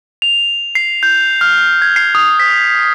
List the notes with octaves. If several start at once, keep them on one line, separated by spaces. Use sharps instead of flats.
F7
C7
G6
F6
G#6
C7
D#6
B6